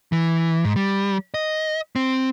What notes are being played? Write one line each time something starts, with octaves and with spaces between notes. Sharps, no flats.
E3
G#2
G3
D#5
C4